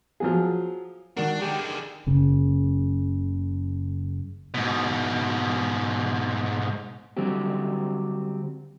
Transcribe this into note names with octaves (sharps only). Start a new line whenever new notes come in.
F3 F#3 G#4
D#3 G#3 D4 F#4 A#4
D3 D#3 G4 G#4
F#1 C#3
G#2 B2
D3 F#3 G3 C4 G4